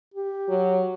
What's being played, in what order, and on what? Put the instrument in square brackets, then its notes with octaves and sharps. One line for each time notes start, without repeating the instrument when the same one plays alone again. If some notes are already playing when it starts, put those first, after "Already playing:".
[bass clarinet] G4
[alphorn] F#3